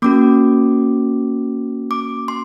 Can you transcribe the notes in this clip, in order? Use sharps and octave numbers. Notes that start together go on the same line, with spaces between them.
A#3 C#4 F#4 D6
D6
C6